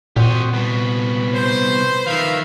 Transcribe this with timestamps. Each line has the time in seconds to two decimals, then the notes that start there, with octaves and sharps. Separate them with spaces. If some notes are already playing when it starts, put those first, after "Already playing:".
0.16 A#2 C4 F#4 G4 D#5
0.53 C2 B2 B4
1.33 C5
2.07 D#3 F3 A#4 E5 F5